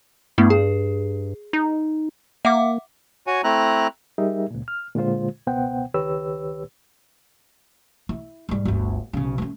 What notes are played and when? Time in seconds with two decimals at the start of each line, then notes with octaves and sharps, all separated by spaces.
0.38 G2 A3 B3 E4
0.50 G#4
1.53 D#4
2.45 A#3 E5 F#5 D6
3.27 F#4 C#5 G#5
3.44 A3 C4 E4 A#5 F#6
4.18 G3 D#4 G4 G#4 A#4 E5
4.51 C#2 A#2
4.68 F6
4.95 A#2 D3 G#3 F4 C5
5.47 C#2 B2 B3 C5 F#5 G5
5.94 C#2 D#3 G4 B4 C#5 E6
8.09 E4
8.49 G#2 G3
8.65 G1 D2
9.13 B1 C#3
9.38 A3 C#4